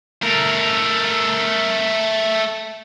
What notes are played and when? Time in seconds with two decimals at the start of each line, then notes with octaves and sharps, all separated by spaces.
0.22 A3 A#4